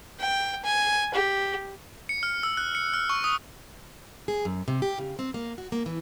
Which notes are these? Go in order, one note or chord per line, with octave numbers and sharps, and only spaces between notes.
G5
G#5
G4
C#7
F6
E6
F#6
C#7
F6
C#6
D#6
G#4
F#2
C3
G4
C#3
C4
A#3
F#4
A#3
E3